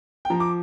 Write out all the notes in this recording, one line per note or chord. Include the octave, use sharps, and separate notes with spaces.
G5
F3 A#5
D6